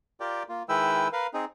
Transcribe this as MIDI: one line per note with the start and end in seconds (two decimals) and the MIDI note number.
0.20 0.43 65
0.20 0.43 67
0.20 0.43 70
0.20 0.43 74
0.20 0.43 79
0.49 0.63 58
0.49 0.63 65
0.69 1.08 51
0.69 1.08 56
0.69 1.08 64
0.69 1.08 71
0.69 1.08 79
0.69 1.08 88
1.13 1.27 70
1.13 1.27 71
1.13 1.27 77
1.34 1.45 60
1.34 1.45 63
1.34 1.45 68